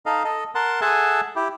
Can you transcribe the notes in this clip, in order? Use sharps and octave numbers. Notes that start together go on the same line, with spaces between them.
D#4 A4 D#5 F5
A4 D#5
A#4 F#5 A5 C6
G#4 A4 E5 F#5 G#5 A5
E4 G4